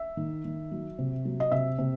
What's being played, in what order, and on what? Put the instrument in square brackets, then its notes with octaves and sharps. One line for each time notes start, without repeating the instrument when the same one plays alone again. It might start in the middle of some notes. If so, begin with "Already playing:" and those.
Already playing: [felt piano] E5
D#3
D#3
F#3
C3
F#3
D#5
C3 E5
C3